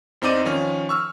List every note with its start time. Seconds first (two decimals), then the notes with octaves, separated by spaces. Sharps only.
0.22 E2 C4 D#4 D5 D#7
0.45 D#3 F3 C#4
0.89 C#6 E6 F6